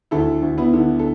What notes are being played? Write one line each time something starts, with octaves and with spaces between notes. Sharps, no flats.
D2 E4 A4
D2
B3 E4
D3
A4